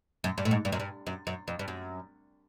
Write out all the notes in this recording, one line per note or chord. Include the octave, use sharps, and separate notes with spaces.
F#2
G2
A2
G#2
G2
F#2
G2
F#2
F#2
F2
G2
F#2